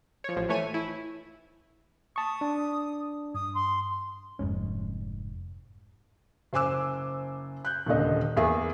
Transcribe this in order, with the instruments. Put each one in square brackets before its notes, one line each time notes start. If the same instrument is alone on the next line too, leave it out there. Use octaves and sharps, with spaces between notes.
[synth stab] F3 C#5
A1 F3
E3 A3 C#5 G#5 D#7
E4
[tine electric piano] A5 C#6 [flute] D#6
[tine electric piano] D4
[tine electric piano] G2 [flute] D#6
[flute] C6
[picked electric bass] F1 G#2 C#4
[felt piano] F#1 C5 G#5 D6 E6
F#6 G6
D#1 C#2 A#2 D3 D#5
E2 A#3 G#4 E5